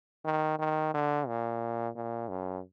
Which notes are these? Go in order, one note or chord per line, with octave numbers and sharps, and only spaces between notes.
D#3
D#3
D3
A#2
A#2
F#2